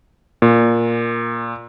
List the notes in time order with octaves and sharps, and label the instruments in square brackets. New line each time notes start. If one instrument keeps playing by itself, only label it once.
[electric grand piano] A#2